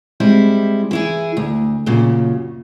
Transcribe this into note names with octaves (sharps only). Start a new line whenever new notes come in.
G3 G#3 C4 E4 C5
E3 E4 G#4
D2
F#2 A#2 C#3